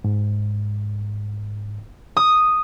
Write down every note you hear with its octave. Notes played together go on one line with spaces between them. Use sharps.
G#2
D#6